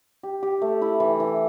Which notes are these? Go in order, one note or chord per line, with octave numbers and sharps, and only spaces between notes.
G4
G4
A3
E4
E3
E3